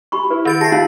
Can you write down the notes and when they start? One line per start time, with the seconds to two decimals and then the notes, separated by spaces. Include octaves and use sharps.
0.12 G4 B5 C#6
0.30 E4 B4
0.45 D#3 A6 D7
0.61 G4 A5 A#6 C7
0.72 C#4 D#4 F4 F5